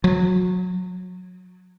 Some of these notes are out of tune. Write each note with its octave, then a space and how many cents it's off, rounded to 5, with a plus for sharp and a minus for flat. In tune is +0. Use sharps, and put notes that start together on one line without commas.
F#3 -25